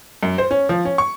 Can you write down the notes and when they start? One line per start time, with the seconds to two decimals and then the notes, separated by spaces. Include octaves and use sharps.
0.23 F#2
0.38 C5
0.51 C#4
0.69 F3
0.85 C#4
0.98 C#6